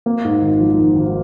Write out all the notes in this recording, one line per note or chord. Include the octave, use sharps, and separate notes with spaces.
A#3
G#2
G#1
F3
G#1
G#1